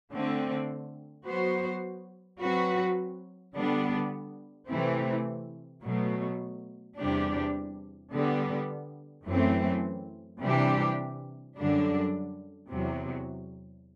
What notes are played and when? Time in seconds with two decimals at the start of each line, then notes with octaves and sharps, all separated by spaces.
0.11 D3 A3 C4
1.26 F#3 B3 F#4 C5
2.40 F#3 C4 F#4 B4
3.55 D3 G3 B3 D4
4.69 C3 E3 A3 C4
5.83 B2 F#3 A3
6.98 E2 C3 G3 D4 G4
8.13 D3 G3 B3
9.27 F#2 E3 A3 C4
10.42 C3 E3 G3 D4 G4
11.57 F#2 D3 G3 D4
12.70 E2 C3 F#3